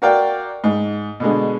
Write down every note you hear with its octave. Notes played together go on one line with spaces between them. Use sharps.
F#4 A#4 D5 F5 G5
G#2
B2 D3 G#3